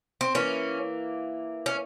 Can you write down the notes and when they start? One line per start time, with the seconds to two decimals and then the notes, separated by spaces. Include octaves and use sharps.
0.21 C4
0.35 E3 A#3 C#4
1.66 C#4